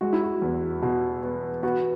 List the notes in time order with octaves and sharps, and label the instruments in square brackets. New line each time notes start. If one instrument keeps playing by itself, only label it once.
[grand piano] G#3 F#4
E4
F#4
E2
B2
B3
B3 F#4